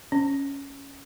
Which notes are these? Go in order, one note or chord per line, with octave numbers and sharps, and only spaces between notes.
C#4